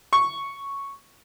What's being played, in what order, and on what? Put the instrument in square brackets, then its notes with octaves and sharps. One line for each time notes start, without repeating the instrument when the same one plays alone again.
[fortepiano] C#6